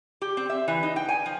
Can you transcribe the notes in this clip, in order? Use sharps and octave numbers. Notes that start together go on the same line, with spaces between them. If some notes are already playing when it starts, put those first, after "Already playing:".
G4
C4
E5
E3
D#4
G5
G#5
F3